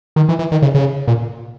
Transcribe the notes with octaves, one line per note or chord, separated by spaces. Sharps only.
D#3
E3
E3
D#3
C#3
C#3
A#2